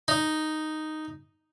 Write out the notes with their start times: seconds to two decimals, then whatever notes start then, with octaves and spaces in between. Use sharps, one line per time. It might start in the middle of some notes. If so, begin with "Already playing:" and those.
0.08 D#4